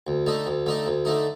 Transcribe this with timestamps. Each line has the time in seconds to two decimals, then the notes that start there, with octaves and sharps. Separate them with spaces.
0.07 D2
0.26 D3 A3 D#4
0.47 D2
0.66 D3 A3 D#4
0.86 D2
1.05 D3 A3 D#4